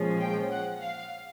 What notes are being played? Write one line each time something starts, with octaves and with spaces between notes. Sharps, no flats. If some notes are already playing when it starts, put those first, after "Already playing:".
Already playing: A#2 F3 G#3 C#4
G5
F#5
F5